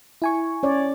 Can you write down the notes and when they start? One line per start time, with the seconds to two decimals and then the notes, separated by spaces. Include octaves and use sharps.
0.22 E4 G#5 C#6
0.63 C#4 C#5 D5